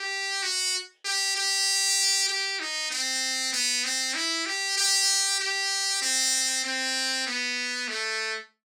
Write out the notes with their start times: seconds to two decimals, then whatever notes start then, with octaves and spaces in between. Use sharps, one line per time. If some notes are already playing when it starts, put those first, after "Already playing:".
Already playing: G4
0.42 F#4
1.05 G4
1.36 G4
2.28 G4
2.60 D#4
2.91 C4
3.52 B3
3.84 C4
4.15 E4
4.46 G4
4.77 G4
5.40 G4
6.02 C4
6.64 C4
7.26 B3
7.88 A3